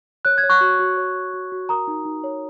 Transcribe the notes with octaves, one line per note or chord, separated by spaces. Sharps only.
C#5 F#6
G#6
C#5
C#6 F#6
F#4
F#4
C#5
C#5
F#4
F#4
A#4 A#5 D#6
D#4
D#4
C#5